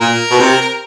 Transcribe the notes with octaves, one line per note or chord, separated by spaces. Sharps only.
A#2 A#4
B2
C3